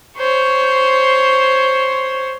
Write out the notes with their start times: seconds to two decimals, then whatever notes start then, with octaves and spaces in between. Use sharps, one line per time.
0.18 C5 C#5